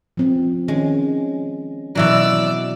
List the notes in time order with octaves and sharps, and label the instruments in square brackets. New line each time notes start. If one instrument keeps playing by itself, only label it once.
[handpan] F3 C4
[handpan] D#3 C#4 [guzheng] G#3
[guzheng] B2 E3 F#3 [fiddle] D5 E6